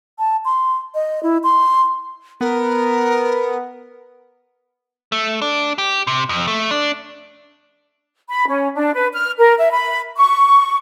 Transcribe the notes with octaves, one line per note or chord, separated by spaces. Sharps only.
A5
C6
D#5
E4
C6
B3 A#4
A3
D4
G4
C3
F2
A3
D4
B5
C#4
D4
B4
F6
A#4
E5
B5
C#6